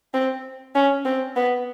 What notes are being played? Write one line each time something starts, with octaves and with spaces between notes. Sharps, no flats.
C4
C#4
C4
B3